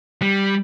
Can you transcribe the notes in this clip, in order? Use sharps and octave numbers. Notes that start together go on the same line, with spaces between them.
G3